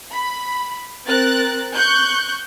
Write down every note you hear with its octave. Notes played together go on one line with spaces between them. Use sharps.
B5
C4 A#4 F#6 A6
C#6 F#6 G6